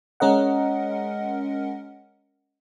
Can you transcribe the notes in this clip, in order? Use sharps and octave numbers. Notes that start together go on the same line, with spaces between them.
G#3 C#4 A#4 D#5 F#5